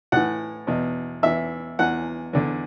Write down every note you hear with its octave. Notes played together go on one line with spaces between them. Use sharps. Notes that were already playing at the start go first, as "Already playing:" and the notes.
A2 E3 F#5
E2 B2
E2 E3 E5
E2 E3 F#5
E2 D3